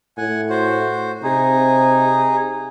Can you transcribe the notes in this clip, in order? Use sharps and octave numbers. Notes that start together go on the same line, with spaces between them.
A2 F#5 G#5
F#4 C5
C3 D#4 G#4